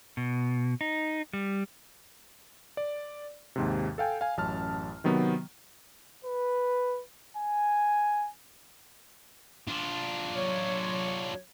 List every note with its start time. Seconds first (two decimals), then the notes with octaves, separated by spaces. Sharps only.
0.17 B2
0.81 D#4
1.33 G3
2.77 D5
3.56 D#2 G#2 C3
3.98 A4 F5 G5 G#5
4.21 F5 G#5
4.37 A1 F#2 A5 F6
5.04 C3 D#3 F#3 B3
6.24 B4
7.37 G#5
9.68 D4 F4
10.35 F#3 C#5